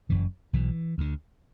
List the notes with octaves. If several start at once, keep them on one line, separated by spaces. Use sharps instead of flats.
F#1 F#2 C#3 E3
B1 B2 E3
D2 D3